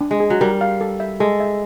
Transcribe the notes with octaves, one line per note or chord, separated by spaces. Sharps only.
D4
G#3
G#4
F#3
G3 A#4
F5
A4
E5
G#3 A4
E5